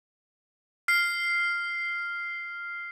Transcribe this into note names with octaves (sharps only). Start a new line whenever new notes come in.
F6 C7